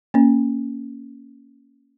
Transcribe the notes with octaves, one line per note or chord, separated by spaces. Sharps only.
A#3 C#4